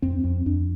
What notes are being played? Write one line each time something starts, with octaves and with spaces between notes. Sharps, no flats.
F2 C4
F2 C4
F2 D4